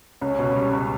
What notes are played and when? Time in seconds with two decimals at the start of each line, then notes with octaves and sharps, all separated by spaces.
0.21 C#2 C#4
0.39 B2
0.56 G3
0.73 C#2